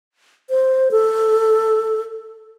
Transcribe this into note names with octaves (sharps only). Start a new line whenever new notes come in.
C5
A4